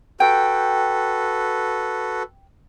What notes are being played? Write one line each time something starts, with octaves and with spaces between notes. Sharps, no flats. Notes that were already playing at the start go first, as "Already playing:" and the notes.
F#4 A4 B4 G5